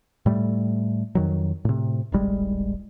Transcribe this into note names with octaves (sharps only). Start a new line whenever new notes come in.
A2 G3 A3
F2 D#3 F#3
A2 C3
D1 G#1 G3 G#3